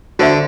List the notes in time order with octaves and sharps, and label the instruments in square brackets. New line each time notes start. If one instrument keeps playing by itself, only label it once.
[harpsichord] D3 [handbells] F#4 C5 E5